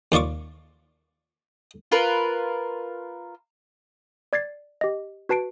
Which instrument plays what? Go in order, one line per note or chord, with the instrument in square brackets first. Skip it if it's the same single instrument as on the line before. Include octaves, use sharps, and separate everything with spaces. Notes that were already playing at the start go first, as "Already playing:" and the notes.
[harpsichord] D#2 F4 D5 C#6 D6
[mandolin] F4 A#4 B4
[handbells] D5 G#6 A6 C7
G4 D#5
F#4 B4 A5 C7 D7